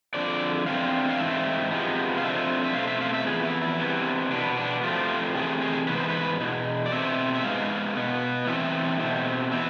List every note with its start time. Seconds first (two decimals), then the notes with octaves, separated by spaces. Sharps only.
0.14 F2 D3 F3 D5
0.66 E2 D3 A3 C4 F5
1.09 F5
1.19 G#2 E3 A3 C4 E5
1.71 C3 F3 G#3 B3
2.18 F5
2.23 F2 D3 F3 A3 C4 E5
2.64 E5
2.74 B2 A3 C4 F5
2.87 E5
3.01 F5
3.14 E5
3.27 F2 E3 B3 G#4
3.45 E4
3.62 E4
3.79 C3 E3 B3
4.31 B2 B3 D4
4.58 D4
4.83 A2 F3 A3 C4 F4
5.35 C3 E3 A3 G#4
5.61 G#4
5.87 G#2 E3 B3 B4
5.98 C5
6.09 B4
6.40 E2 B2
6.86 D5
6.91 B2 A3 C4 E5
7.35 E5
7.43 G#2 G#3 B3 F5
7.95 B2 B3
8.47 A2 E3 A3 C4 E5
8.99 B2 A3 C4
9.52 E3 B3 E5